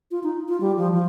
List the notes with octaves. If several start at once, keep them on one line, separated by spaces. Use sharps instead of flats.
F4
D#4
F4
G3
F3
F3